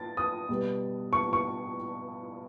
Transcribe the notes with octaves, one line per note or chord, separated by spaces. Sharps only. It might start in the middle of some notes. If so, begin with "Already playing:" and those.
Already playing: A6
D#6
B2 G3 B3
C#6
C#6